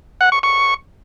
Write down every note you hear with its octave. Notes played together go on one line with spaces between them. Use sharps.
F#5
C#6
C#6